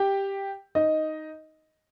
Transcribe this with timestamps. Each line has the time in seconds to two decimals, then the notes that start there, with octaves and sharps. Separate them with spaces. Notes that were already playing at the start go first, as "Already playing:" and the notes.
Already playing: G4 G5
0.75 D#4 D#5